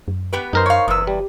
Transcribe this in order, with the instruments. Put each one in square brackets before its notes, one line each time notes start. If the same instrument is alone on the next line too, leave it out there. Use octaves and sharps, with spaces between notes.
[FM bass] F#2
[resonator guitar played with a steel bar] B3 G4 B4
[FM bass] F#2 [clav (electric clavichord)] D#4 A#4 C5
[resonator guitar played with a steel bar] C#5 F5
[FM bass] F#1 [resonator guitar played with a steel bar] E2 B4 [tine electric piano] D#6 E6
[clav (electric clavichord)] G3 [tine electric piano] G4